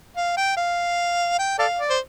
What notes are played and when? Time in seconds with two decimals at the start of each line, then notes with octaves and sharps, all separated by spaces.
0.17 F5
0.37 G5
0.57 F5
1.39 G5
1.59 A4 D5 F5
1.79 D5
1.90 C5